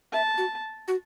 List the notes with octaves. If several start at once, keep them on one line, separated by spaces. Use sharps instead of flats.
E5 A5
F#4
F#4